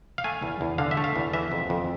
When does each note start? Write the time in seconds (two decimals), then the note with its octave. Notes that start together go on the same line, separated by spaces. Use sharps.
0.18 F5
0.24 A3 G#5
0.42 E2
0.61 E2
0.78 D3 F5
0.91 E5
0.97 A3
1.04 F5
1.16 E2
1.33 E3 E5
1.52 F2
1.70 F2